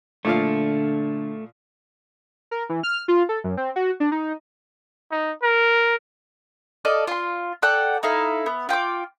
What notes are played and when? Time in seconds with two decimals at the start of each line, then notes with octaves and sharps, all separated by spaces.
0.25 A#2 D3 F3 A3 F5
2.51 A#4
2.69 E3
2.83 F6
3.08 F4
3.29 A4
3.44 F#2
3.57 C4
3.76 F#4
4.00 D4
4.12 D#4
5.12 D#4
5.43 A#4
6.85 A4 D5 D#5 F5
7.07 F4 C6
7.62 A4 D5 F#5 G5
8.03 D#4 E4 A4 F5
8.46 B3
8.69 F4 G5 B5 D6